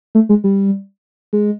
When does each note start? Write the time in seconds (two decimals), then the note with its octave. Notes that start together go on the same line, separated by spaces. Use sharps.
0.15 A3
0.29 G#3
0.44 G3
1.33 G#3